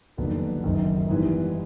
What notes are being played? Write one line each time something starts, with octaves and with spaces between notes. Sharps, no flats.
F1 D#2 D3 F#3 B3
F#1 F#2 D#3
G#2 E3 G3 B3 E4